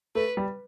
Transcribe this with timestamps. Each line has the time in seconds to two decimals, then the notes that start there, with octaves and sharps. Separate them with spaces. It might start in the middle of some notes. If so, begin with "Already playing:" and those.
0.15 A3 B4
0.37 G3